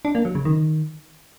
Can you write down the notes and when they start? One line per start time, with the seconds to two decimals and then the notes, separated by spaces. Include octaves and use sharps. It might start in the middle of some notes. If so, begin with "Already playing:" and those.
0.05 D4
0.15 A#3
0.25 F#3
0.35 C#3
0.45 D#3